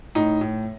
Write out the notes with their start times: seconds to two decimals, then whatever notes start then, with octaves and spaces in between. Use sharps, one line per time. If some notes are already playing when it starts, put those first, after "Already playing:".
0.15 A2 D#4
0.41 A2